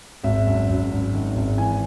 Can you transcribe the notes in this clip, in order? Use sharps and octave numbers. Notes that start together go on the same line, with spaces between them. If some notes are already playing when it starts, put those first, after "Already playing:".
G#1 E5
F#2
F#2
G#1
D#3
G#1
E3 G#5